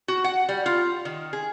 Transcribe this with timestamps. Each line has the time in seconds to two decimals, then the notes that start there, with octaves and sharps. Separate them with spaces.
0.08 F#4
0.24 F#5
0.49 G3
0.66 F4
1.05 D#3
1.33 G#4